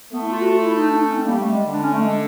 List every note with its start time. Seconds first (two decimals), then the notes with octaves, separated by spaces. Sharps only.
0.13 A3 B3
0.21 E4
0.31 F4
0.41 F#4
0.50 F4
0.63 E4
0.75 D#4
0.88 D4
0.98 D#4
1.07 C#4
1.16 C4
1.25 G3 A#3
1.38 A3
1.51 G#3
1.64 D3
1.73 D4
1.82 C#4
1.92 A3
2.01 G#3